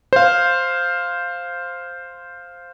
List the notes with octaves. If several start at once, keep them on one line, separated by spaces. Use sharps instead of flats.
C5 F5